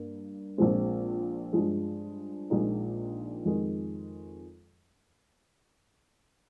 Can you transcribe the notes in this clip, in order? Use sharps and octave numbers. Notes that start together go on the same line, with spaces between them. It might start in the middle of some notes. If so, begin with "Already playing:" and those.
Already playing: G2 A#3
A#1 A#2 F3 G#3 C4
G2 F3 G#3
A#1 A#2 G#3 D#4
F2 D#3 G#3